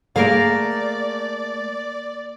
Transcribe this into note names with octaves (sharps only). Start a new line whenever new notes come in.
A3 A#3 G#4 A#4 D5 F5 D7